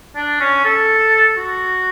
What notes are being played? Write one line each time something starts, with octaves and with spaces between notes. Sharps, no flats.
D4
C#4
A4
F#4